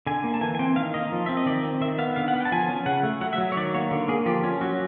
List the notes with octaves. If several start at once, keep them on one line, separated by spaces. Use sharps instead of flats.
D3 G#5
A#3
A5
E3 G#5
G#5
C4 G5
D#3 F5
A#3 D#5
F3
C4 E5
D#5
D#3 D5
C4
D#3 E5
B3 F5
D3 F5
F#5
B3
G5
A5
F3 G#5
C#4
C#3 F#5
A3
F#3 F#5
E5
F#3
C#5
D#3 D5
A#3 C#5
D3
A#3 G#4
F3 G4
C#4
F#3 F#4